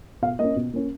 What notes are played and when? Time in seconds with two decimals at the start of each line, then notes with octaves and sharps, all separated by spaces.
0.22 B2 F5
0.39 A#3 C#4 D#5
0.56 B2
0.73 A#3 C#4